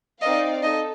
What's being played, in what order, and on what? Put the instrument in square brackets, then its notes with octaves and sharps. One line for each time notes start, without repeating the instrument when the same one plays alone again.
[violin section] C4 D#4 A#4 D5 F5 [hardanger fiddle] D#5
[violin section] D#4 A4 [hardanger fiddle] D#5